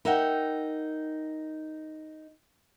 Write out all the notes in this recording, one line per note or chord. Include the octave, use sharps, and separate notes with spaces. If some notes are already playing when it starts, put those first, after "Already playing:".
D#4 A#4 E5 F#5 G5